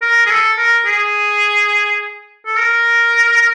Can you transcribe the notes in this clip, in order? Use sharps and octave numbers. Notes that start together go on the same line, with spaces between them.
A#4
G#4
A4
A#4
G#4
A4
A#4